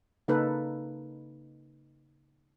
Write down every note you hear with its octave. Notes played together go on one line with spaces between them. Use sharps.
C#3 A#3 D#4 A4 B4